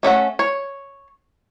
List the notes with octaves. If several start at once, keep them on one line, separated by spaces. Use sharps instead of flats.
A3 C#4 E5 F#5
C#5